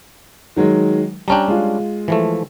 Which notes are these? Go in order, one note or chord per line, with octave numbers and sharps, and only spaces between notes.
D#3 F#3 G#3
G3 C#4 D4 G5 A5 A#5
G#3 F4
E3 F3 A3